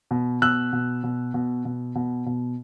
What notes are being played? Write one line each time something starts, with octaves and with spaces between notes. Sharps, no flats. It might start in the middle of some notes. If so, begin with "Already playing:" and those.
B2
B2 E6 F#6
B2
B2
B2
B2
B2
B2